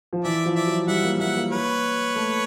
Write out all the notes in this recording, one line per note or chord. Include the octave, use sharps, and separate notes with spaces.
F3
E3 D5 E5
F3
D5 E5
F#3
G3 E5 F#5
A#3
A#3 E5 F#5
A#3
B4 C#5
A3